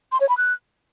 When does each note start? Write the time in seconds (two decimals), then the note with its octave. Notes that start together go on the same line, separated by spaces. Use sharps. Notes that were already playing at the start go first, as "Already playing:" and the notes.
0.12 C6
0.20 C#5
0.29 B5
0.37 F#6